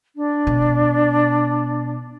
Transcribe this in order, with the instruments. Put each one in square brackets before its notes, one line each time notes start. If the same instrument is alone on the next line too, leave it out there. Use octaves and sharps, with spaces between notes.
[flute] D4
[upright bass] B2